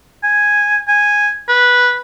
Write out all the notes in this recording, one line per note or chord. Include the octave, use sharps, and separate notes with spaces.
G#5
G#5
B4